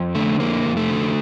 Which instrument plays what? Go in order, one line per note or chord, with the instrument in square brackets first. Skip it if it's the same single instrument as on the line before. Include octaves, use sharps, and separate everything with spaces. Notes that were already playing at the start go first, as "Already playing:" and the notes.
Already playing: [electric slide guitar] F2
D3 A3
F2 A#3
F2
A3
D3